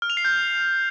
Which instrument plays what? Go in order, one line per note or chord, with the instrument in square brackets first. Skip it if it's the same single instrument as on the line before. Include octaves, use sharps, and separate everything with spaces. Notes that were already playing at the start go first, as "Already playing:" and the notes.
[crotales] F6
F7
C7
G6